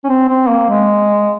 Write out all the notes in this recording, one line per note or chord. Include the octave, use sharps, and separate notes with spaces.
C#4
C4
C4
A#3
G#3